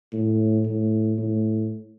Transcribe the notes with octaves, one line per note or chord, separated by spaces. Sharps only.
A2
A2
A2